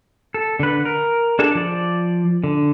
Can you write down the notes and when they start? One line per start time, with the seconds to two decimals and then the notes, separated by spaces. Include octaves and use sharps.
0.34 A4
0.60 D3 B4
0.85 A#4
1.39 D4 G#4 A4 A5
1.55 F3 D5
2.44 D3